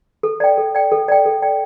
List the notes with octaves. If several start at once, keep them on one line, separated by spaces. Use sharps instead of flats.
A4
D5 G5
A4
D5 G5
A4
D5 G5
A4
D5 G5